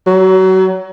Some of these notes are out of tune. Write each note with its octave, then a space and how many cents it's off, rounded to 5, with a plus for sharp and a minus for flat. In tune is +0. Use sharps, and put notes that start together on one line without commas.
F#3 +30